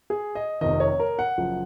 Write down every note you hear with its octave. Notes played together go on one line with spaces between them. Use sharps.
G#4
D#5
F1 F2 C3 D#3 D#5
C#5
A#4
F#5
F#1 F#2 F3